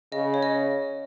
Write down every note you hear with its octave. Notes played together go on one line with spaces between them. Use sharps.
C#3 D#5
C#5
D#5